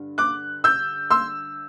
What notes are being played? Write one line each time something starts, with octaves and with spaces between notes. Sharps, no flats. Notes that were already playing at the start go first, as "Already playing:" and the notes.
Already playing: G2 D3
D6 F#6
E6 G6
C6 E6